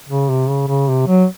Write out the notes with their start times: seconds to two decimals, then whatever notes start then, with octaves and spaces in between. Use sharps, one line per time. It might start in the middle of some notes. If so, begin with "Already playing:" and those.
0.09 C#3
0.29 C3
0.49 C#3
0.68 C#3
0.88 C3
1.07 F#3